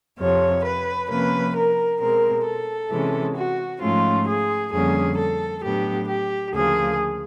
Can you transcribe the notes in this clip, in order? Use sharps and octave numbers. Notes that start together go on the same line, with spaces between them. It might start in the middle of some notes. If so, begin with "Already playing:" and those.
F2 C3 F3 C#5
B4
C3 F3 A#3 C#4 B4
A#4
B2 G#3 C4 A#4
A4
C3 E3 G#3 C#4
F#4
G#2 F3 A3 C#4 F4
G#4
F2 D3 G3 A#3 C#4 G#4
A4
A2 F#3 B3 D4 G4
G4
D2 C#3 F3 A#3 G#4